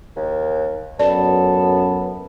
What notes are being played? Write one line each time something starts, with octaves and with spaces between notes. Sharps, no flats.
D#2
F#2 B3 A4 B4 D5